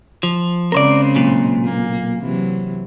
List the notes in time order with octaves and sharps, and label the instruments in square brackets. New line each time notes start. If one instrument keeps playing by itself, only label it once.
[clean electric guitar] F3
[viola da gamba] C#3 G#3 C4 [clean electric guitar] A#4 C5 D5
[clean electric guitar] B1 A#2
[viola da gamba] A#3
C3 E3 F#3